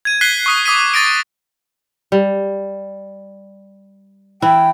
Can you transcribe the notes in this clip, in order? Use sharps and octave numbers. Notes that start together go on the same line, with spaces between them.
G#6 D#7
F#6 B6 C7 D#7 G7
C#6 D#6 C7
D6 D#6 B6 D#7
C#6 A6 A#6 D7
G3
E3 E4 G5